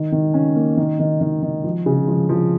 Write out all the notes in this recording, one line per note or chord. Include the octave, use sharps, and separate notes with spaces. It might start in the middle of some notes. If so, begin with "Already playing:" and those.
Already playing: D#3
D#3
C#4
A#3
D#3
D#3
D#3
D#3
F3
C#3
F3
F3